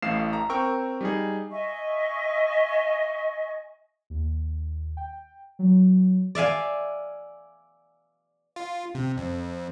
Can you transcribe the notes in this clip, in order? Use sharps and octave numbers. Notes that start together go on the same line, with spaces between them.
A1 A2 F5 C7 E7
A#5
C4 A#4 G5 C#6 E6
G3 D#4 G#4
D#5 E5 G#5 C#6
D#2
G5
F#3
D5 E5 F5 G#5
F4
C3
F2